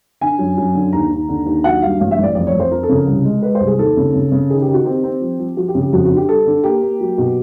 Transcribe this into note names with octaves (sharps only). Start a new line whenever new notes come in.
D3 G#5
F#2
F#2
D3
D#2 A#5
D#2
D3
D#2
F#3 F#5
G2 F5
A1 F5
E5
A1
D5
F2 D5
C#5
F2
C5
F3 A#4
A4
C#3
A#4
C2
G#3
G#3 B4
C5
C2
G#4
D#2 A4
C#3
C#3
C#3
D#3 G#4
G4
D#3
F#4
C4 G4
C4
F3
F3
F3 F#4
G4
C#3
G4
F2 F#4
F#4
D3
G4
G3 A4
D3
A#3 G4
A#3
F#3
B2